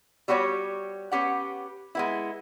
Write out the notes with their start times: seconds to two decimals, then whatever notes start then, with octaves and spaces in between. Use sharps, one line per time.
0.28 G3 B3 F#4 G4 C#5
1.12 B3 C#4 G4 F#5
1.95 G#3 B3 E4